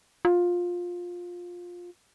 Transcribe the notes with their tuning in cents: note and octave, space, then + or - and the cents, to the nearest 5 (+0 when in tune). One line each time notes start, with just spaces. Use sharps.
F4 +15